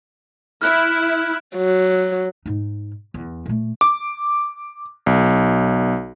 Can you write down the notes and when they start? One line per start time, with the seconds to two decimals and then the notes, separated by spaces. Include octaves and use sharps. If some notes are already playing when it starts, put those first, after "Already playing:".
0.61 E4 F6 F#6
1.57 F#3
2.46 G#2 D#4
3.14 E2
3.46 A#2 A3
3.81 D6
5.06 B1